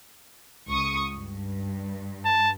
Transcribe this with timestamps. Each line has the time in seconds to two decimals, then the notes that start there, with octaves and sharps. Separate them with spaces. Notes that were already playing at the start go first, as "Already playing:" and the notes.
0.68 C#2 C#6 D#6
1.13 G2
2.26 A5